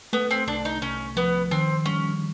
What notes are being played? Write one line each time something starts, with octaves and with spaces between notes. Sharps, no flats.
A3 B3
C4
C2 D4
D#4
C2 C#4
F3 B3
D#3 C4
G3 C#4